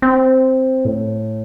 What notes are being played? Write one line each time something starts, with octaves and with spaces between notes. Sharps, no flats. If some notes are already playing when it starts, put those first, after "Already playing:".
C4
A2